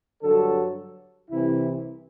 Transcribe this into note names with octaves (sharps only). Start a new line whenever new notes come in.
G2 D3 F#3 A4
C2 C3 E3 E4